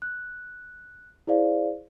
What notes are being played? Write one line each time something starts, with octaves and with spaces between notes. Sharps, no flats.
F#6
E4 G#4 C5 D5 F5